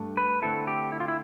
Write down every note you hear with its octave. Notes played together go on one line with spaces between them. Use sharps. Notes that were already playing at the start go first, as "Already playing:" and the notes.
Already playing: G2 A3 D4
B4
D3 A3 C4 E4 A4
G4
E4
F4
E4